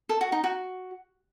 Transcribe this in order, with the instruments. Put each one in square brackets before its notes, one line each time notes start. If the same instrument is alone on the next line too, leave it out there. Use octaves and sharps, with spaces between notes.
[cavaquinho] A4
F#4
D#4
F#4